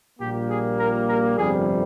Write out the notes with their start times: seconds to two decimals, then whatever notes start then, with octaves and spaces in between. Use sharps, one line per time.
0.19 A#1 A#2 G3 A#3 G4
0.49 G#4
0.79 A#4
1.08 A#4
1.37 G1 F2 C3 G3 G#4